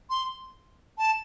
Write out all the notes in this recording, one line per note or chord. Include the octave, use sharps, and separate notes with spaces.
C6
A5